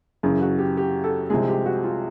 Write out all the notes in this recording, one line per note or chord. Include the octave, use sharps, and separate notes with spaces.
F#2 C#3 E3 G#4
F#4
G4
G4
A4
C2 C3 F3 G#3 G#4
G4
F#4
F4